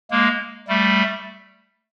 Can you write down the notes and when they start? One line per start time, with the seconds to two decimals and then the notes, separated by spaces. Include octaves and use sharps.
0.11 G#3 A#3
0.68 G3 A3